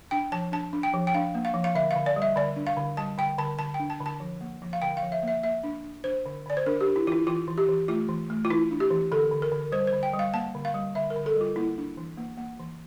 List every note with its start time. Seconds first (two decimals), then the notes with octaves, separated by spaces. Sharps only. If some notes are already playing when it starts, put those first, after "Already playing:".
0.11 D4 G5
0.32 F3 A5
0.52 D4 A5
0.73 D4
0.83 G5
0.93 F3
1.07 G5
1.14 D4 F5
1.35 A#3
1.45 F5
1.54 F3
1.64 F5
1.75 D3 E5
1.91 D3 F5
2.06 D5
2.16 G3
2.22 E5
2.36 D3 D5
2.56 D4
2.67 F5
2.77 D3
2.97 G3 A5
3.18 D3 G5
3.38 D3 A5
3.59 D3 A5
3.74 G5
3.80 D4
3.90 A5
4.00 D3
4.06 A5
4.20 F3
4.41 A#3
4.62 F3
4.73 F5
4.82 D3 G5
4.97 F5
5.03 F3
5.12 E5
5.23 A#3 E5
5.43 A#3 E5
5.63 D4
5.84 D4
6.04 D4 C5
6.26 D3
6.46 D3 D5
6.57 C5
6.66 D4 A#4
6.81 G4
6.87 D4
6.96 E4
7.07 E3 F4
7.12 E4
7.27 E3 F4
7.48 E3
7.58 G4
7.68 E3
7.88 A3 F4
8.09 E3
8.30 A3
8.45 F4
8.49 E3 E4
8.71 D4
8.80 G4
8.91 E3
9.12 D3 A4
9.31 D3
9.42 A#4
9.52 D3
9.72 G3 C5
9.87 C5
9.93 D3
10.03 G5
10.14 G3
10.19 F5
10.33 A#3 A5
10.55 D3
10.65 F5
10.74 G3
10.95 D3 E5
11.10 A#4
11.16 D3
11.26 A4
11.36 G3 F4
11.56 A#3 E4
11.78 D4
11.97 E3
12.18 A#3
12.38 A#3
12.59 E3